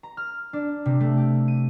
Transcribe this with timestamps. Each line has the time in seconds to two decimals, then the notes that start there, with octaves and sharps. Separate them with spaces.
0.03 A#5
0.17 F6
0.53 D4
0.86 C3
1.00 A3
1.17 G4
1.48 D#7